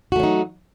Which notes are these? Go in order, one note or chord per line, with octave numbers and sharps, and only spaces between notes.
F#3 A3 D#4 F#4